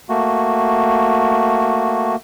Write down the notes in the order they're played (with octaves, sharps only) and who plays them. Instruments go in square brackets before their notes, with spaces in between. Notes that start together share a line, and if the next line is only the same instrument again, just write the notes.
[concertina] A3 A#3 F#4